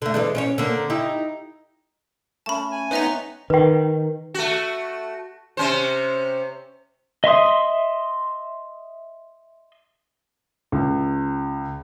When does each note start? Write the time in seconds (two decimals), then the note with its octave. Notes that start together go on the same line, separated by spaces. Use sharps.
0.02 D3 A3
0.14 E3 G#3 D4
0.35 C#4 F#4 C#5
0.58 D3 A#3
0.90 D#4 E4 G4
2.46 A3 C#4 A5 B5
2.72 G#5
2.91 B3 C4 D#4 C#5 E5 A#5
3.50 D#3 B4 G5
4.34 A3 F#4
5.57 C3 C#4 C5
7.24 D#5 E5 C6 D#6
10.72 C#2